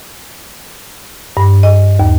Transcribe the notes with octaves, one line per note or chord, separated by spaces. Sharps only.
G2
D#5
D#2